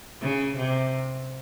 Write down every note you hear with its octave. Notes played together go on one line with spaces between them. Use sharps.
C#3
C3